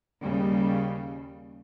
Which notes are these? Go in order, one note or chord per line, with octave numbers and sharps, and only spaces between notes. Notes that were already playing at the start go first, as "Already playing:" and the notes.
D#2 C#3 G3